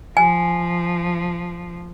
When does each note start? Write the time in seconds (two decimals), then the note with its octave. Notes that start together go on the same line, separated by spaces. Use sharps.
0.17 F3 G#5